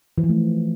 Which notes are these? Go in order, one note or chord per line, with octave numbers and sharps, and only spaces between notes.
E3
F3
A3